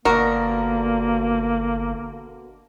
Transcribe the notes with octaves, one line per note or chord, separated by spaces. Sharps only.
G1 B2 D3 A#3 F#4 A#4 D5